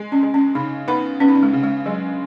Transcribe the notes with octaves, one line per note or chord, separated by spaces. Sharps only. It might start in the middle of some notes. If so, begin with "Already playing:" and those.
Already playing: G#3
C#4
G#3
C#4
C#3 D#4
B3 D#4
B3 C#4
D#4
C#4
G#3
C#3
G#3
F#3 G#3